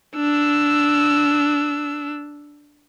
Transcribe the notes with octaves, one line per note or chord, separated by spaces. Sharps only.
D4 E6